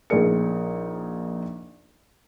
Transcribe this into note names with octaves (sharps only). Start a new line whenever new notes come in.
A#1 D#4 G#4 A#4 C#7